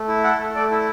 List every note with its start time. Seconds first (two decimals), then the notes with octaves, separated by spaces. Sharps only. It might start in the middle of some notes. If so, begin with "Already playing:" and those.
Already playing: A3
0.08 E4
0.24 A4 F#5
0.39 A3
0.55 A3 D5
0.71 E4